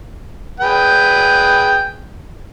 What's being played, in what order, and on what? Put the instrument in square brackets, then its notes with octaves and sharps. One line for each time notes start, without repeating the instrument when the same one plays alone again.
[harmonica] G#4 B4 G5